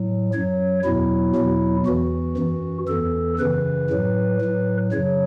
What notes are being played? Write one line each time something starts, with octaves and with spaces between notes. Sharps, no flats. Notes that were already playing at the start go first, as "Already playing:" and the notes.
Already playing: A2 F#3
F#2 F#3 C#5
E2 B2 F#3 E4
E2 B2 F#3
E2 E3 F#4
F#2 E3
E2 E3 A4
F#2 C#3 E3 B4
A2 F#3
A2 F#3
F#2 C#3 F#3 C#5